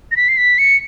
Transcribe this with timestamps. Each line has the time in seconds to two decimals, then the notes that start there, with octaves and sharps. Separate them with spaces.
0.12 A#6
0.17 B6
0.28 C7
0.38 B6
0.58 C#7